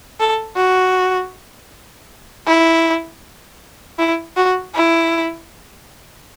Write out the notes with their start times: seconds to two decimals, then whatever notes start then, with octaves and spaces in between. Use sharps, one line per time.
0.20 A4
0.57 F#4
2.47 E4
3.99 E4
4.37 F#4
4.75 E4